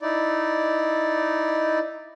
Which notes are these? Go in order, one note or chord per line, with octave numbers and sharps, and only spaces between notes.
D#4 E4 D5